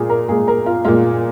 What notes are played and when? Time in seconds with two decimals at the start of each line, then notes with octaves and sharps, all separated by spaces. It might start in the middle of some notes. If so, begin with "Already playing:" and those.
Already playing: A#2 G#3 F4 G#4
0.10 A#4
0.29 A#2 G#3 G#4
0.48 A#4
0.66 F4
0.85 A#2 G#3 F4